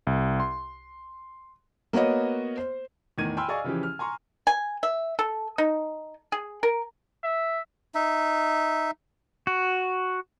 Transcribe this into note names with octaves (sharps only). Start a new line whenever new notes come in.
C2
C6
A#3 B3 F#4 C#5 D#5
C5
E2 A2 D#3 G#6 D#7
G5 G#5 B5 C6 E6 F6
G#4 D5 D#5 F5 G#5 C#6
C#3 E3 F3 C#4 G4
F6
G#5 A#5 C6 C#6
G#5
E5
A4
D#4
G#4
A#4
E5
D#4 E5
F#4